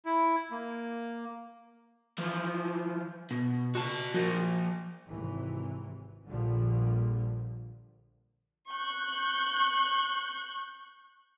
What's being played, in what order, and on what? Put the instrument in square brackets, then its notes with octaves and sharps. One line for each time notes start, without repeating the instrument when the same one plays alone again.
[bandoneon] E4
A#3
[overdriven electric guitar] E3 F3
B2
F#4 A5
F3 A#4
[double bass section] G#1 C3 E3
A#1 A#2 D3 F3 G3
[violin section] C#6 F#6 G6